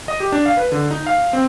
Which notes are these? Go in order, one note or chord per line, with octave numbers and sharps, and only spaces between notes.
D#5
G4
D4
F5
B4
D3
D#4
F5
C4